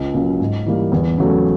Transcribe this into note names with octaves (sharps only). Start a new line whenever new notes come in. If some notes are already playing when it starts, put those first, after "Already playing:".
Already playing: C#2
C#3 F#3 A#3
G#2
E3 G3 A#3
E2
C#3 F#3 A3